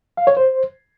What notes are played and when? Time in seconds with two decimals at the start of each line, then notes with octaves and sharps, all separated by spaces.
0.17 F5
0.27 C#5
0.37 C5